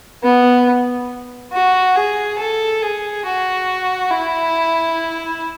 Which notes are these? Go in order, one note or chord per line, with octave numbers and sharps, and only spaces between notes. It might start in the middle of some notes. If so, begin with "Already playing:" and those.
B3
F#4
G#4
A4
G#4
F#4
E4